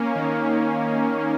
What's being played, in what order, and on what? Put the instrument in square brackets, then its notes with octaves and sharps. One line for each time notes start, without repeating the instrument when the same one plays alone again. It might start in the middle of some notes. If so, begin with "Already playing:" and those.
Already playing: [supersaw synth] A#3 C#4
D#3